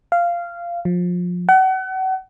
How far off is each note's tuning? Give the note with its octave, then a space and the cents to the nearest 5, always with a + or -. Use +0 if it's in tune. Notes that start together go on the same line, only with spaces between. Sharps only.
F5 -15
F3 +25
F#5 +35